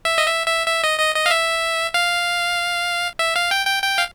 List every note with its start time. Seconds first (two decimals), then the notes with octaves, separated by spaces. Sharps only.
0.05 E5
0.18 D#5
0.26 E5
0.47 E5
0.67 E5
0.84 D#5
0.99 D#5
1.15 D#5
1.26 F5
1.31 E5
1.94 F5
3.19 E5
3.36 F5
3.51 G5
3.67 G5
3.83 G5
3.98 F5